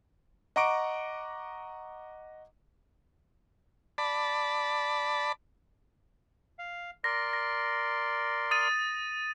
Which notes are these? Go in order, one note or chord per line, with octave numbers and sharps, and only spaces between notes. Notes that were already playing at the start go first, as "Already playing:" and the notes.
D#5 F#5 A#5 C#6 D6 D7
D5 A5 B5
F5
A#4 D5 C6 A#6
A#6
D#6 A6 D#7